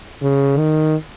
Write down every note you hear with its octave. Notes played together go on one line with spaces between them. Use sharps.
C#3
D#3